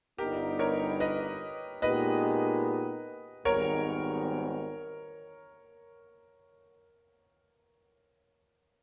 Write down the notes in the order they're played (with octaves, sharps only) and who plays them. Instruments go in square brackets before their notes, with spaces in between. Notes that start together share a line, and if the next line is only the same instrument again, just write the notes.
[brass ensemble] G1 G2 G3 B3 D#4 [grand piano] G4 A#4
[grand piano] A#4 C#5
B4 D#5
[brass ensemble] A#2 G#3 B3 D#4 G4 [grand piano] B4 D#5
[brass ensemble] G#1 G#2 D#3 G3 B3 [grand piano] A#4 C#5